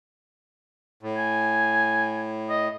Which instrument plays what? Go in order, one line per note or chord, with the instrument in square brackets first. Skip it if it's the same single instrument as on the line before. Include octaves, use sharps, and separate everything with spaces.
[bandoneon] A2
[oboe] G#5
D#5